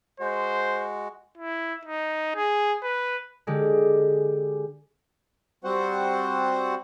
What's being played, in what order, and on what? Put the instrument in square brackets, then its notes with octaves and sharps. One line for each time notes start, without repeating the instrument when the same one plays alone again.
[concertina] G#3 F#4 [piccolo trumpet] C5
[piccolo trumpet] E4
D#4
G#4
B4
[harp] D3 G#3 G4
[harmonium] G3 C4 F#4 C5 F#5